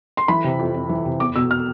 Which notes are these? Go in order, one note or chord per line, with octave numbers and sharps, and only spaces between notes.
C6
E3 B5
C3
F2
F2
E3
C3
E2 D6
B2 E6
F6